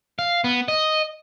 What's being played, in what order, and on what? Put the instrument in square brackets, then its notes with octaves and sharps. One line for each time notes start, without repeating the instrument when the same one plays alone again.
[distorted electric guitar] F5
B3
D#5